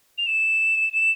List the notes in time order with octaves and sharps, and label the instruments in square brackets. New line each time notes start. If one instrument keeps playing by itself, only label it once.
[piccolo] F7
E7
E7